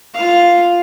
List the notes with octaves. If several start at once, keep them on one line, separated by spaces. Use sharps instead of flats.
F4 F5